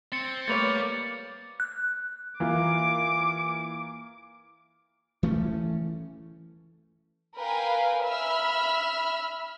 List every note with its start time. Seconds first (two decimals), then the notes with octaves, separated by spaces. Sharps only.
0.12 C4 A6 C#7
0.48 G3 A3 A#3 B4 C#5 D5 A6 F7
1.60 F#6
2.40 E3 A#3 F4 D6
5.23 E3 A3 C#4
7.38 A#4 B4 F5 G5 G#5
8.05 E5 B5 E6 F6